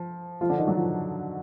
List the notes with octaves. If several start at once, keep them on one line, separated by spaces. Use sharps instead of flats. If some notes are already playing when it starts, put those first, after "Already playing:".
Already playing: F3
F3 F4
D3 D4
D#3 D#4
F#3 F#4
F3 F4